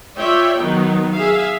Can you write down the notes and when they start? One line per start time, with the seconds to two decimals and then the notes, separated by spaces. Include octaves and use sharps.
0.17 F4 C#5 D5 E5 G5
0.58 D#3 F#3 B3 D#4
1.13 G#4 E5 F5